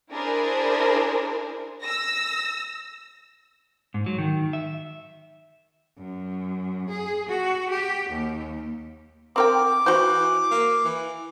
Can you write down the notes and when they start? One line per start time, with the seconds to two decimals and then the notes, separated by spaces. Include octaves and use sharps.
0.12 D4 E4 G#4 A#4 C5
1.82 E6 A#6
3.94 G#2
4.06 F#3
4.18 D#3
4.53 E5
5.98 F#2
6.89 G#4
7.28 F#4
7.70 G4
8.09 D#2
9.36 C4 A#4 G5 D6
9.86 E3 F#4 C5
10.51 A#3
10.85 E3